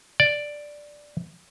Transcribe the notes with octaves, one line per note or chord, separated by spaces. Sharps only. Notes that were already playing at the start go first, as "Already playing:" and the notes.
D5